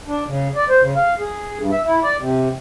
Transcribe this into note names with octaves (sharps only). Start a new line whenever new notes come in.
D4
C#3
D5
C5
C#3
F5
G#4
G2
E5
E4
D5
C3